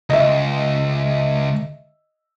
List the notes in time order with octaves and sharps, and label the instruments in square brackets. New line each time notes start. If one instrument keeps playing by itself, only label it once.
[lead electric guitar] C#2 [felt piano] D#5 E5